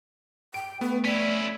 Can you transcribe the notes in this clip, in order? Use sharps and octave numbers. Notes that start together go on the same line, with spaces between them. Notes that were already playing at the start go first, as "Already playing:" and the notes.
G5 D7
A3 B3 B4
C#4 E4 D5 B6